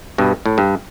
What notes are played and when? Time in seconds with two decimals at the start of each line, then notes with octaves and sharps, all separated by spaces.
0.18 G2 B2
0.46 A2
0.58 G2